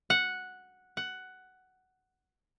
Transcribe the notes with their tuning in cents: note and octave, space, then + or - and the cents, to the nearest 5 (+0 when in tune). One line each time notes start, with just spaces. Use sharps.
F#5 -5
F#5 +10